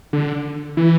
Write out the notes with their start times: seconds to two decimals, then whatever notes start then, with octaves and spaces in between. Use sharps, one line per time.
0.13 D3
0.77 E3